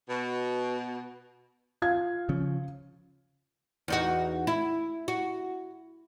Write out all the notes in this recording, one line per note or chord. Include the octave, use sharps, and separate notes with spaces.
B2
F4 F5 G#6
C#3 F3 C#4
E2 D#4 F#4
E4
F#4